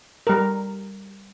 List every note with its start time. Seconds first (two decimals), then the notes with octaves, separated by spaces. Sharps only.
0.27 G3 A#4